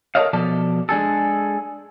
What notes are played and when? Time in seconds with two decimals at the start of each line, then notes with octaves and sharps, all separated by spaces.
0.15 A4 A#4 C5 C#5 D#5 F5
0.33 B2 F3 A4 D5 A5
0.89 G#3 D4 G#4 A4